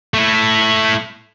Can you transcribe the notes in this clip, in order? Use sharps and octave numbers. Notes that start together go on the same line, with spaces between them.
A3 E4